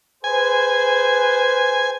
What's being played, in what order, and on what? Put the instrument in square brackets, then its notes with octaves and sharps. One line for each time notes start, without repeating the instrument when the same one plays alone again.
[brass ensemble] G#4 B4 C5 [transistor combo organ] G#5